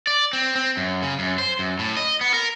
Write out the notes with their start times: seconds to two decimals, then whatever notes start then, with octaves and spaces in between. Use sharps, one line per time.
0.07 D5
0.33 C4
0.56 C4
0.77 F#2
1.02 C#3
1.19 F#2
1.38 C5
1.59 F#2
1.79 A2
1.97 D#5
2.21 B3
2.34 A#4